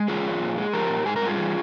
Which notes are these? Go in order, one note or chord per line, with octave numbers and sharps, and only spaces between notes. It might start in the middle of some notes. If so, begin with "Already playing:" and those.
Already playing: G#3
E3 F4 G#4
F2
A#2
G#3
F3 G4 A#4
A#2
G#2 G#4
A#4
G3 F4 G#4
E3